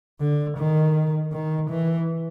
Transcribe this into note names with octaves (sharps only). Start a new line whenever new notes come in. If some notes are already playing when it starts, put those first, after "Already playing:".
D3
D#3
D#3
E3